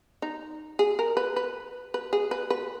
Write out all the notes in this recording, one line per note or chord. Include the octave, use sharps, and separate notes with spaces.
D#4
G#4
A#4
B4
B4
B4
G#4
B4
B4